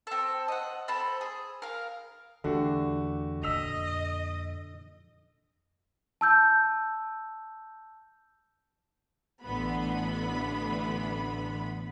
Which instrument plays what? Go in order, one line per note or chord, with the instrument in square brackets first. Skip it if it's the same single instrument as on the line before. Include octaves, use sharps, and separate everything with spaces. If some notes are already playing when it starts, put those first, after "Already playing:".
[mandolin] C4 A4
D#5 F#5
C4 A4 A5 B5
G#4
A#4 F5
[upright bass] E2 [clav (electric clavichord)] D3 [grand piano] A3 F#4 G4
[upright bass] F2 A#2 [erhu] D#5 [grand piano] E6 B6 F7
[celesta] A5 E6 G6
[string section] A1 D3 E3 B3 B5